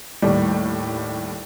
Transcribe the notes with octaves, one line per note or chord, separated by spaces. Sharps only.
D#2 A2 G3